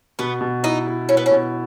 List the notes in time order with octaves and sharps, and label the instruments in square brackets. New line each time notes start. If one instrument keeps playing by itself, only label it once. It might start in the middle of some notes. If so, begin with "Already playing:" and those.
[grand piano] B2 [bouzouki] B3
[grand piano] B2
[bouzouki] D#4 [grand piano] E4
[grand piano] E4
[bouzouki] C#4 [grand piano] E4
[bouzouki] B3
C#4
[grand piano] B2